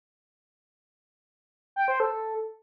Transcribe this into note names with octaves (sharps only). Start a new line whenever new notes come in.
G5
C5
A4